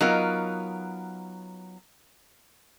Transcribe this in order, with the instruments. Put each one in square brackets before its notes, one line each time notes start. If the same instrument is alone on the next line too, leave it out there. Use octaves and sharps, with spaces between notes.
[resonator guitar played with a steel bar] F#3 B3 D#4 F4 A#4